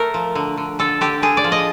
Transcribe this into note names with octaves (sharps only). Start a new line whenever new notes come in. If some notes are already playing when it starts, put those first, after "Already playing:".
Already playing: A3 A#4
F3
D3
D3
D3 A4
D3 G4
D3 G#4
D5
F3
D#5